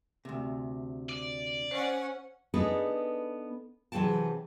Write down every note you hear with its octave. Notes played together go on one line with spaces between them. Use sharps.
D2 C3
D5
C#4 C5 F#5
B3 D4 D#4 G#4 A4 B4
C3 E3 F#3 G#4 G5 A5